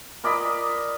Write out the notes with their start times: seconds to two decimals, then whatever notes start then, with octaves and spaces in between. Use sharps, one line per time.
0.24 A#4 D5 D#5 B5